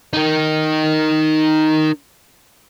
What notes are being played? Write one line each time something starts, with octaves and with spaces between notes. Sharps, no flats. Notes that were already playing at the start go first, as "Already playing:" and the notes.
D#4 A#4